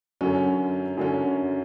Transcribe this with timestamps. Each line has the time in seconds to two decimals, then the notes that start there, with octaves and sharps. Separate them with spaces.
0.21 F#2 D3 F#3 C#4
0.97 F#2 D3 F#3 C#4